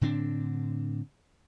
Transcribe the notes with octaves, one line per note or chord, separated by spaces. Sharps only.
A2 D3 C4 D4